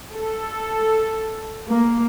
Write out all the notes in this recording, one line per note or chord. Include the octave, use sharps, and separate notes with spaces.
A4
A#3